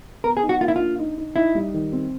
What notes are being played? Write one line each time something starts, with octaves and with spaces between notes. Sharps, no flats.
B3 A#4
G#4
D#4
F#4
A#3 F4
E4
D4 F4
D#4
D#4
D#4 E4
G3
D#3
C4